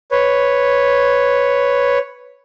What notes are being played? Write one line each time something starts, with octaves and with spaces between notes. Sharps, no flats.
B4 C#5